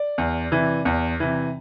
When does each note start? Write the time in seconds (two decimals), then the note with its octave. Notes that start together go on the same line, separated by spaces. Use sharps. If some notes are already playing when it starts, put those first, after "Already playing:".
Already playing: D5
0.18 E2
0.52 C3 E3
0.85 E2
1.20 C3 E3